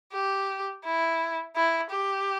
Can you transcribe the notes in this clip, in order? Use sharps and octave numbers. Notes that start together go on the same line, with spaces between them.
G4
E4
E4
G4